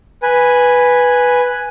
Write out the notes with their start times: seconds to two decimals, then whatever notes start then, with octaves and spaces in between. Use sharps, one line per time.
0.23 B4 G#5